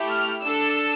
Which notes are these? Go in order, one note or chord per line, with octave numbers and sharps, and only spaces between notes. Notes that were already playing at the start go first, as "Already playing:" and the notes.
Already playing: A3 E4 G4
F6
D4 A4 E6